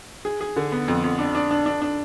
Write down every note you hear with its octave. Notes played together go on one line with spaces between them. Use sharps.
G#4
G#4
D3
B3
F2
F2
D4
D4
D4
D4
D4